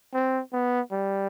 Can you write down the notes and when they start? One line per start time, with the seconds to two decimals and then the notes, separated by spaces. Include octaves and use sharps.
0.14 C4
0.53 B3
0.92 G3